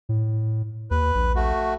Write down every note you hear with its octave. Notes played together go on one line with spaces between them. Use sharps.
A2
D#2 B4
A#1
A3 F#4